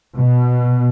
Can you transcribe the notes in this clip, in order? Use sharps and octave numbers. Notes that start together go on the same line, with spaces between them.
B2